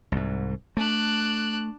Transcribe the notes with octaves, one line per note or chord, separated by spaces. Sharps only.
C2 G#2
A3 D4 F#6